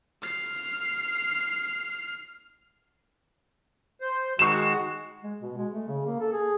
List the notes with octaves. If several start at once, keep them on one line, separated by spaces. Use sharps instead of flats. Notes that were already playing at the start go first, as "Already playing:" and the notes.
F6 C7
C5
D#3 G#3 F#4 C#6 C7 E7
G#3
B2
G#3
A3
C#3
A#3
A4
G#4